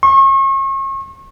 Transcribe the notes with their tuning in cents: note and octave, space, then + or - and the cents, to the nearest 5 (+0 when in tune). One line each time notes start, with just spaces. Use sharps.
C#6 -40